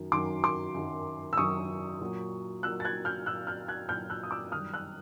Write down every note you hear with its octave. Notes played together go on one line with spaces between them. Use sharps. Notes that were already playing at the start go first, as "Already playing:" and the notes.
Already playing: F#2 D#3 F#3
F#2 D#3 F#3 C6 D6
C6 D6
F#2 D#3 F#3
E6
F#2 D#3 F#3 C#6 D#6
A#2 F#3
A#2 F#3 E6 F#6
A6
F#6 G#6
F6 G6
A#2 F#3 E6 F#6
F6 G6
F#6 G#6
A#2 F#3 F6 G6
E6 F#6
D#6
D6 E6
F#2 D#3 G3 D#6 F6
E6 F#6